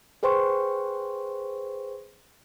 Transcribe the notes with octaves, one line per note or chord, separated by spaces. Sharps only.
G#4 B4 C5 G5 C6 C#6